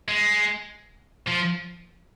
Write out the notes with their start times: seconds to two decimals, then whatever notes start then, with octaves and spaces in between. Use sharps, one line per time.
0.08 G#3
1.27 F3